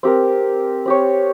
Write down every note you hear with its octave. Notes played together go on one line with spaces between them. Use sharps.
C4 G4 A#4
C4 G4 C#5